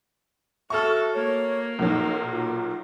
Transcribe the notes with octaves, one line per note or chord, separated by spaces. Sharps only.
F#4 A4 E5 C#6 F6
A#3 C#5
B1 A#2 F#3 D#4
F4